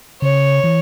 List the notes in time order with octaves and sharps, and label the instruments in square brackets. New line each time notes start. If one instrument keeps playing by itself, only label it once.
[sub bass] C#3 [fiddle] C#5
[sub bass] E3